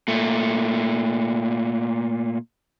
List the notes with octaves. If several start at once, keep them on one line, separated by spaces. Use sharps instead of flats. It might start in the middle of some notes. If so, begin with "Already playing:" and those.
A#2 A3